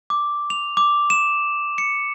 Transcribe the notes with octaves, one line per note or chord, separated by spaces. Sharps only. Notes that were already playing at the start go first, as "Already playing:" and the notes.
D6
F7
D6
E7
C#7